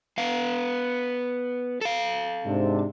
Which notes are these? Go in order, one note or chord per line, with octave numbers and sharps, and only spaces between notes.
B3 F5
A4 F5
G#2 C3 D4